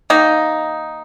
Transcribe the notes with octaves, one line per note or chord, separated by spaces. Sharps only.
D#3 A#3 D#4